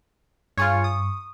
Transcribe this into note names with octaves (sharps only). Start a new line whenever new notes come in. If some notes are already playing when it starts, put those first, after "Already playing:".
G2 F4 G#4 C#5 C#6
D#6